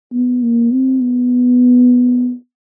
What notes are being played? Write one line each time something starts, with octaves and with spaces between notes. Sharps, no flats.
B3
A#3
C4
B3